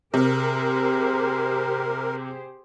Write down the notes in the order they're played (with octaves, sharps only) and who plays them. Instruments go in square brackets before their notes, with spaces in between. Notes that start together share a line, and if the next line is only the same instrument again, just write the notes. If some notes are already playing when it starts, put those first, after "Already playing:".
[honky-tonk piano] C3 [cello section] G4 G#4 C5 [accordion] A#4